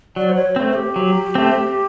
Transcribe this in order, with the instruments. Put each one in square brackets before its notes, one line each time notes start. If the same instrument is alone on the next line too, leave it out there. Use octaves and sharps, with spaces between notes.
[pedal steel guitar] F#3 [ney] D5
[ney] C5
C#5
[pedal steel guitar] A3 C4 [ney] C5
[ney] G4
[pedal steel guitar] F#3
A3 C4